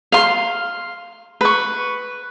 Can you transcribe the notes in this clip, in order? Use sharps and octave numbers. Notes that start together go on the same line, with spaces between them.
F5 C6
B4 C#6